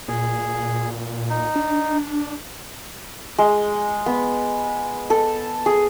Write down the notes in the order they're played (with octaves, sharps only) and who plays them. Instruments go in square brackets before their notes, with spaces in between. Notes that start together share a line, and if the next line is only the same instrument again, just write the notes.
[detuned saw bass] A#2 [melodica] G#4
[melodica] D#4
[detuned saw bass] D4
[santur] G#3
B3
A4
G#4